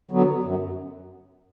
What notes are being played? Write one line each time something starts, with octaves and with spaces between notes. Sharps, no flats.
D3 F#3 B3
F#2